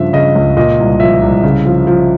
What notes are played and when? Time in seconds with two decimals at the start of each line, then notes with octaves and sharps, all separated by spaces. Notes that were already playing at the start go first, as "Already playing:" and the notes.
Already playing: G2 C#3 F3 E5
0.13 C#3 D#5
0.35 C#2
0.57 A#2 D#5
0.79 C2
1.00 F3 E5
1.22 C2
1.43 C#3
1.66 F3
1.87 F3